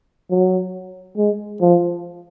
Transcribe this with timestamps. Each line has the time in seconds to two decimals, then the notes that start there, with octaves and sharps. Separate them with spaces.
0.31 F#3
1.18 G#3
1.61 F3